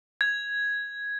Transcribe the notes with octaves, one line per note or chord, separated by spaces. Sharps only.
G#6